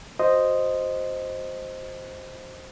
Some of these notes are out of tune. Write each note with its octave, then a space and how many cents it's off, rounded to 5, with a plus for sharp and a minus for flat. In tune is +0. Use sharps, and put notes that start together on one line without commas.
F#4 +0 C5 +0 D#5 -5